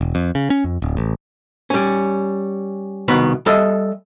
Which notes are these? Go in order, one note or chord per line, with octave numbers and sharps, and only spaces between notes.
E1
F2
C#3
C#4
F2
D1
A1
G3 C#4
C2 B2 D#3 B3 B4 B5
G3 A4 D#5 E5